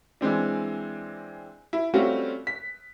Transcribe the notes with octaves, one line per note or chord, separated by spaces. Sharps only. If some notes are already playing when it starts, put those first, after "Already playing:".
E3 G#3 C4 D4
E4
G3 A3 C4 C#4 F4 F#4
B6